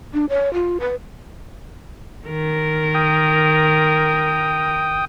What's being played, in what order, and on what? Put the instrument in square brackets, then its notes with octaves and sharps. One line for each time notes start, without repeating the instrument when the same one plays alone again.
[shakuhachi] D4
C#5
F4
B4
[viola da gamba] D#3 A#4
[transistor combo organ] G5 D#6